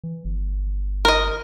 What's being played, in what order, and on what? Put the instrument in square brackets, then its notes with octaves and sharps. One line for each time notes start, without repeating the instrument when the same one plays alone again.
[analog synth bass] E3
G1
[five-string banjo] A#4 D#5